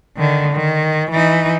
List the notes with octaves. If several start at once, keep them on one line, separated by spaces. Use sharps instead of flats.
D3 D#3
D#3
E3 D#4